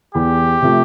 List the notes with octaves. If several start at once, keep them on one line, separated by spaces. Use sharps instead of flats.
E2 G4
C3 F3 A3